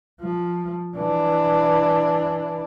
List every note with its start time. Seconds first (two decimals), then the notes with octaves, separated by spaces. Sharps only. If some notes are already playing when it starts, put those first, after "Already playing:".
0.21 F3
0.96 E3 D4